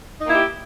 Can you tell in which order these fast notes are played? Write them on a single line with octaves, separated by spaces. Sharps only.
D#4 A#3 E4 G4